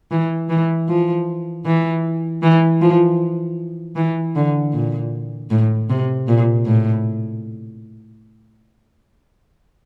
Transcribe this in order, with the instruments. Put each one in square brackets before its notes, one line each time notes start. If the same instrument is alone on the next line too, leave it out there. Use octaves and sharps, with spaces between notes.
[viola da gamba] E3
E3
F3
E3
E3
F3
E3
D3
A#2
A2
C3
A#2
A2